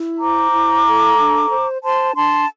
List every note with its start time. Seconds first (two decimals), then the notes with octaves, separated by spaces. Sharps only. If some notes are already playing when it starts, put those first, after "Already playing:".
Already playing: E4
0.19 C5 A#5 D6
0.51 E4
0.85 A4
1.17 D4
1.49 C5
1.82 C5 A5 C6
2.16 D4 A5 C6